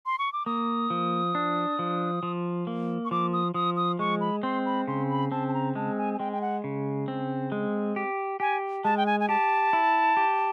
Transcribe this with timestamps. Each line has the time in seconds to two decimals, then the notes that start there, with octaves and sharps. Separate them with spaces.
0.06 C6
0.19 C#6
0.33 D6
0.46 A#3 D#6
0.90 F3
1.35 D4
1.79 F3
2.23 F3
2.67 A#3
3.05 C#6
3.11 F3 D6
3.33 D#6
3.54 F3 D#6
3.77 D#6
3.99 G#3 C#6
4.21 B5
4.43 C4 C6
4.66 B5
4.87 C#3 C6
5.09 B5
5.31 C4 A5
5.48 A5
5.54 A#5
5.75 G#3 A5
5.98 G#5
6.14 G#5
6.19 G#3 G5
6.33 G5
6.41 F#5
6.64 C#3
7.08 C4
7.52 G#3
7.96 G4
8.40 G4 G#5
8.84 G#3 A5
8.97 G5
9.06 G#5
9.20 G#5
9.29 G4 A5
9.73 E4
10.17 G4